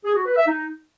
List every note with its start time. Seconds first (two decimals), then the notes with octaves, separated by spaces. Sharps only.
0.05 G#4
0.15 F#4
0.26 B4
0.36 E5
0.47 D#4